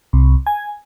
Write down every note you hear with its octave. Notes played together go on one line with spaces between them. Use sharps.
C2
G#5